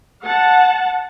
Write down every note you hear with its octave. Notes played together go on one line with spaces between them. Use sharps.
F#5 A5